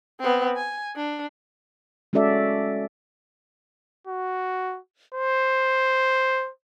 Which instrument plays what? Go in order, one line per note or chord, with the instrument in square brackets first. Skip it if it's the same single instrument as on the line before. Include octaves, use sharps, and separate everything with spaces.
[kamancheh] B3 C4
G#5
D4
[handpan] G#3 C#4 F#4 A4 D5 E5
[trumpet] F#4
C5